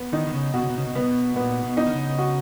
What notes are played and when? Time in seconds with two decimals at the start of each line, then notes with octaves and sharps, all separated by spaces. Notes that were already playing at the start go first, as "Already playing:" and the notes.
Already playing: B3
0.12 D#3 D#4
0.27 D#3
0.33 C#3
0.54 B2 F#4
0.62 C#3
0.69 B2
0.77 C#3
0.86 B2
0.94 C#3 B3
1.01 B2
1.36 A#2 B3
1.64 B2
1.77 D#4
1.86 D#3
1.92 C#3
2.18 F#4